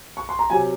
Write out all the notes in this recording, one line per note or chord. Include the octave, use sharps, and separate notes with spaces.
C#6
C6
A#5
C3 F#3 G#5